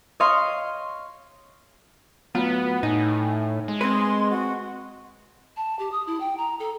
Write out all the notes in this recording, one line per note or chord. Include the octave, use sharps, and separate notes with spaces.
C#5 D#5 F5 C6
A2 F#3 B3 F4 B4
A2 D#4 G#5
G#3
C4 B4 C6
F#4
A5
G4
D#6
E4
G5
A#5
A4